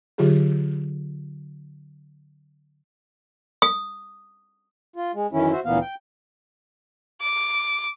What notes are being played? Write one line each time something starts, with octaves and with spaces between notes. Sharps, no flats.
D3 F#3 F4 G4 G#4
D#6
F4
G#3
F#2 D#3 E3 C#4 E4
F#4 C5 E5
D2 A#2 E3 A#3 B3 F5
G5
D6